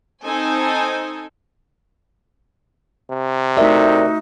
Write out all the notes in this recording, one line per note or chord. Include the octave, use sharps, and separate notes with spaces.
C4 D#4 A4 G#5
C3
A3 D#4 F#4 A#4 D5 E5